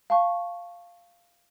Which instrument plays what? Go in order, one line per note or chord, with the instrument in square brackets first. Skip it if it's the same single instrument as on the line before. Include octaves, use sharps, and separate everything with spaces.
[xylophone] F5 A5 C#6